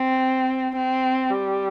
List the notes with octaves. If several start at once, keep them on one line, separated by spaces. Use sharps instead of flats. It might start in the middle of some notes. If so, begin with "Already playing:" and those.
Already playing: C4
C4
G3